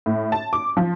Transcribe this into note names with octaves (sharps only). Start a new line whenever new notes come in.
A2
A5
D6
F3